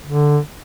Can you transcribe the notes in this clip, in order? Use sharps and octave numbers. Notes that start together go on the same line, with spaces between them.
D3